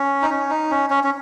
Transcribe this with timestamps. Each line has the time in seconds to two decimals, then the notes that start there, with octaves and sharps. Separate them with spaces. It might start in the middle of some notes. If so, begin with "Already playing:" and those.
Already playing: C#4
0.22 D#4
0.30 C#4
0.50 D#4
0.71 C#4
0.90 C#4
1.04 C#4